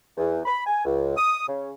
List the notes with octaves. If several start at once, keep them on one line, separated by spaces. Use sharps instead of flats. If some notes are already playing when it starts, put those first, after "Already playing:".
E2
B5
G#5
C#2
D#6
C#3